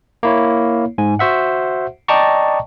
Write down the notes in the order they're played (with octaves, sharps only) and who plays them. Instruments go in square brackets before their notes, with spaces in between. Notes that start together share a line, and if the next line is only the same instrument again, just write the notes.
[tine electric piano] A#3 E4 C#5
G#2 G#5
F#4 C5 E5 F#5
D5 D#5 G5 A5 A#5 C#6